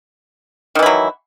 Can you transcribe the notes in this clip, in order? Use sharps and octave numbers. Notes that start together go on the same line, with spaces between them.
D#3 E3 F#3 E4